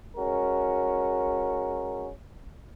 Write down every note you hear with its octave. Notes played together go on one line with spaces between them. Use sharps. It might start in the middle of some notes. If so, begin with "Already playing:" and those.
G#3 C#4 F#4 A#4